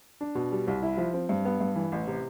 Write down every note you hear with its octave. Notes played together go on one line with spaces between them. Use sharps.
D4
B2
G3
C2
E4
F3
C4
G2
B3
G2
E3
A1
C3